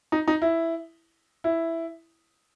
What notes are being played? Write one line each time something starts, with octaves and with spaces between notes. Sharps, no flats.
D#4
D#4
E4
E4